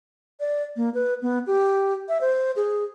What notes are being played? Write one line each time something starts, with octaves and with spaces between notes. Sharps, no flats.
D5
A#3
B4
B3
G4
E5
C5
G#4